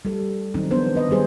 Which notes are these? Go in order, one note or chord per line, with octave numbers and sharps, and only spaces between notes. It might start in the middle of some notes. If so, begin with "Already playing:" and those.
G3 A4
D#3 F#3 C4 D#4
F3 B3 D4 C5
B4 D#5
D#3 F#3 G3 G#4 C5